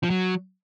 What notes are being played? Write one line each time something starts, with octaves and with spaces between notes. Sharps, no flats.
F3
F#3